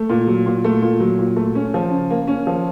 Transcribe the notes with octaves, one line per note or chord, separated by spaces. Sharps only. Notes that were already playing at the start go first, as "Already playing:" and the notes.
Already playing: A3
A#2
F#3
A#2
A3
A#2
F#3
A#2
A3
C#4
F3
C#3
A#3
C#4
F3